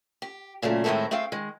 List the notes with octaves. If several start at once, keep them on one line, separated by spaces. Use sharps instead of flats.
G4
A#2 C#3 F#3 A3
A2 D#3 G#3 C4 E4 A4
A3 C4 G#4 F5 G5
D#3 G#3